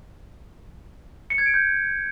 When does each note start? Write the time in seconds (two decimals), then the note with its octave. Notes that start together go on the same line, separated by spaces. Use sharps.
1.30 C#7
1.38 G#6
1.46 D7
1.54 G6